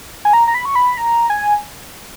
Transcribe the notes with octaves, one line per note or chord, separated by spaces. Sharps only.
G#5
A#5
A#5
B5
C#6
B5
A#5
G#5